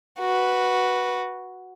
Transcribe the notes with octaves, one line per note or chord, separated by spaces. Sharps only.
F#4 B4